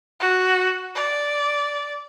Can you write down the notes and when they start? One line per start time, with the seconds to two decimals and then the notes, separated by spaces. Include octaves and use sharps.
0.20 F#4
0.95 D5